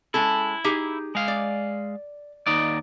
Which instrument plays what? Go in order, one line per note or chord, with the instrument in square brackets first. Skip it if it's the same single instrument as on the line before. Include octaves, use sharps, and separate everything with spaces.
[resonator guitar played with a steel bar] G#3 C#4 A4 [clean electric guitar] E4
[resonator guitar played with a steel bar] D#4 G4 G#4
[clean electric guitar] G#3 F5
[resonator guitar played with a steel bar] D5
[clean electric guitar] D#2 D#4 D5